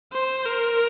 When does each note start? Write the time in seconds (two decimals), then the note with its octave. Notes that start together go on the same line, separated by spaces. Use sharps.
0.13 C5
0.46 A#4